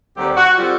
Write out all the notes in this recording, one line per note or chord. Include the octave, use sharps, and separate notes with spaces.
D#2 D3 G3 C4 G4
F#4
D3 G3 C4 F4